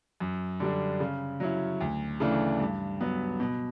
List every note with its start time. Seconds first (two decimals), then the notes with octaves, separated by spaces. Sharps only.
0.20 F#2
0.60 D3 G3 D4
1.00 C#3
1.40 F#3 C#4 E4
1.80 D2
2.20 C#3 E3 A3 D4
2.60 G2
3.01 F#3 B3
3.40 B2